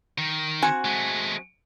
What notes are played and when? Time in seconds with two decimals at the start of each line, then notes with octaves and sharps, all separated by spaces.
0.18 D#3
0.62 C4 F#4 G#5
0.85 G#3 A3